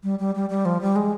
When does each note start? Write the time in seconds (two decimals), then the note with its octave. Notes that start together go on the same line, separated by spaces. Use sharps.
0.04 G3
0.19 G3
0.35 G3
0.50 G3
0.65 F3
0.81 G3
0.96 G#3